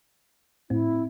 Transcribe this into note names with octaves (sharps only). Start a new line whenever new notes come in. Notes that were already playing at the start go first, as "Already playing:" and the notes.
A2 C4 E4